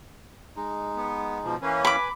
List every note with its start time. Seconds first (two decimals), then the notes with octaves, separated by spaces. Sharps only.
0.56 G#3 D#4
0.96 B3
1.44 B2 F3
1.62 E3 A#3 C#4 B4 G#5
1.85 B5 D6